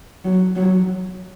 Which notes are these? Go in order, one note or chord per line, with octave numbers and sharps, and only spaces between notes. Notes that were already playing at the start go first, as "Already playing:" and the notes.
F#3
F#3